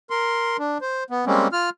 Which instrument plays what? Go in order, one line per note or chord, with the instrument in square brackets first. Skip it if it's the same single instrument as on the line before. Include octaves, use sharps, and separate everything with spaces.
[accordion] A#4 C6
D4
C5
B3
G3 G#3 A#3 C4 C#4
F4 F6